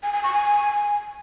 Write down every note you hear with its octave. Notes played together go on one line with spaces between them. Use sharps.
G#5
G#5
C#6
G#5